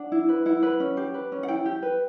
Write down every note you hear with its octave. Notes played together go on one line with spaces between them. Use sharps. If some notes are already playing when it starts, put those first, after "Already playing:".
Already playing: D4 F#5
E4
B4
E4 F#5
B4
C#4
G4
B4
C#4
F#5
E4 G5
G4
B4